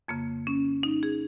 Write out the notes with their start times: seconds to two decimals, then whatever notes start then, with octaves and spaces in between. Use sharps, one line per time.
0.08 F2 C#3 A#3
0.47 C#4
0.83 D#4
1.03 G#4